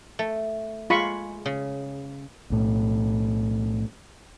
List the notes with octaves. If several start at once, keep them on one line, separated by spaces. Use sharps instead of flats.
A3
G#3 F4 B5 C#6
C#3
B1 A2